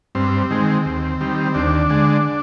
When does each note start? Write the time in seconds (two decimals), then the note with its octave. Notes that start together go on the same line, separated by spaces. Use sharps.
0.15 G2 C4
0.50 D#3 G#3
0.85 D#2
1.21 D#3 G3
1.54 D#2 D4
1.89 D3 G#3